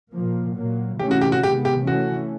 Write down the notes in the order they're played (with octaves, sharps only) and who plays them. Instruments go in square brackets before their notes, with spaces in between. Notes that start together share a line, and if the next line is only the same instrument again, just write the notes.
[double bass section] A#2 F3 A#3
A#2 F#3 A#3
[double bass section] C3 E3 A3 C#4 [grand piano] G4
[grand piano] F#4
G4
F#4
[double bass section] C3 D#3 G#3 B3 [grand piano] G4
[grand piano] G4
[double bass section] E3 A3 C#4 [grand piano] F#4